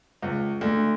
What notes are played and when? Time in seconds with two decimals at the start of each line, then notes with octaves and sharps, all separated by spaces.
0.22 C#2
0.61 D2